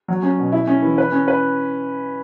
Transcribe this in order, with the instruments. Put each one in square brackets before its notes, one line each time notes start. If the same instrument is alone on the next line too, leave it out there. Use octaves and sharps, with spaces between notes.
[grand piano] F#3
C#4
B2
E4
C#4
E3
B4
C#4
B4